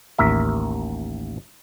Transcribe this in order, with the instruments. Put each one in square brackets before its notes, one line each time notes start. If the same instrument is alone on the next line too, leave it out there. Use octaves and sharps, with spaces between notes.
[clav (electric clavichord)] A1 D#2 A#4 E5